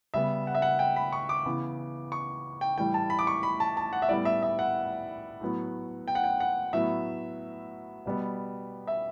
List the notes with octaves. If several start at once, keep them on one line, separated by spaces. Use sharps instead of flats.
C#3 G3 B3 E5
F#5
E5
F#5
G5
B5
C#6
D6
C#3 E3 B3
C#6
G5
A2 E3 G3 G5
A5
B5
D6
C#6
B5
A5
A5
F#5
E5
A2 G3 B3 D5
E5
E5
F#5
A2 F#3 B3
G5
F#5
G5
F#5
A2 F#3 B3 E5
B2 G3 B3
E5